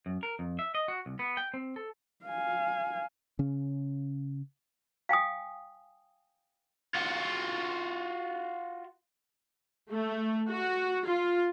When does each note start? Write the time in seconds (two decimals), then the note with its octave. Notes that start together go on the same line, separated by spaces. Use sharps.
0.06 F#2
0.23 A#4
0.39 F2
0.59 E5
0.75 D#5
0.88 F#4
1.06 C2
1.19 B3
1.37 G5
1.54 C4
1.76 A4
2.25 F5 G#5
3.39 C#3 C#4
5.09 F5 G5 G#5 D#6
6.95 F4 F#4
9.90 A3
10.50 F#4
11.06 F4